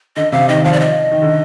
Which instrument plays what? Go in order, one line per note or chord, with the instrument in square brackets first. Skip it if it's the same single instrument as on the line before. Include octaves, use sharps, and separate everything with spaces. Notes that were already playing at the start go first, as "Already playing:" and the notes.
[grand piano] D3 [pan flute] D#5
[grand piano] C3 [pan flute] F5
[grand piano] D#3 [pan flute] D#5
[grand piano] F3 [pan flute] F5
[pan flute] D5
D#5
[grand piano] D#3
D3